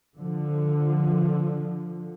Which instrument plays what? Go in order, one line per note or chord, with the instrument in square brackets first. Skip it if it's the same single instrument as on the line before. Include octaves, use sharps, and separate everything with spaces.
[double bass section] D3 F3